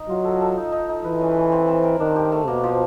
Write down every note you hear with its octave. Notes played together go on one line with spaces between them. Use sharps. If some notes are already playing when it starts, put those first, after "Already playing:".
Already playing: D#4 D#5
F#3 F4
A4
A4
D#4
D#4
D#4
E3 B4
C#4
C#4
C4
C4
A#4
D#3 D4
G4
A3
B2 A#3
F3